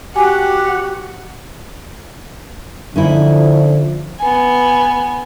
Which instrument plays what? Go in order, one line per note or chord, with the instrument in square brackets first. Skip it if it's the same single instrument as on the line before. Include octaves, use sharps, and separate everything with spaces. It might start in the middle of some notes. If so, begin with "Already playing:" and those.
[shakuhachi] F#4 [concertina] G4 [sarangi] F#5 [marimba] G#5
[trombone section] D3 F3 [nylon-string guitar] C#4 D#4 E4
[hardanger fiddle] B3 G#5